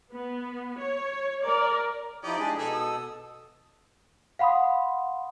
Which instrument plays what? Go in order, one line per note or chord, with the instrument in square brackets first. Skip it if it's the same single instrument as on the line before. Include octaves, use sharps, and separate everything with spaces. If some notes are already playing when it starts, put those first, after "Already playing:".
[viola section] B3
C#5
A#4 D5
[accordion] F3 D#4 E4 [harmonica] G4 D5 D#5
[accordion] G#3 D4 G#4
[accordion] B2 A4 E6 [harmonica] D#4 G#4
[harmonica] D#6
[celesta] F5 F#5 B5 C6 D#6